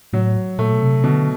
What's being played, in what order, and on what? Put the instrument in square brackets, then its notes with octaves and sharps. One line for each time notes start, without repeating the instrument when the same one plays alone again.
[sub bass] A2 [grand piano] F#3
[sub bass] A#2 [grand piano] A3
[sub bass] B2
C3
[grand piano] B2 [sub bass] D3